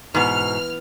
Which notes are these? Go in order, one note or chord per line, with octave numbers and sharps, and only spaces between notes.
G#2 B2 E3 B3 E4 F6